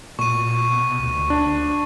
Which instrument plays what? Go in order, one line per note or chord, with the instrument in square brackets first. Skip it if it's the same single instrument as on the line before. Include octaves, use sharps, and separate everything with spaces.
[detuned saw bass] A#2 [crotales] C#6 D#7
[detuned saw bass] B2
D2
[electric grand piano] D4